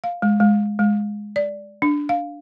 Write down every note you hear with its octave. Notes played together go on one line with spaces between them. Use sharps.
F5
G#3
G#3
G#3
D5
D4
F5